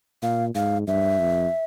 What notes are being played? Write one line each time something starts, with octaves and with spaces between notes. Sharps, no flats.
A#2 F5
G#2 F5
G2 E5
F2